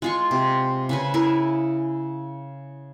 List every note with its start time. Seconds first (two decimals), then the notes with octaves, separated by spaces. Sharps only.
0.02 G#3 F4 C#6
0.31 C3
0.89 C#3 B4 G#5
1.14 E4 G#4 A#4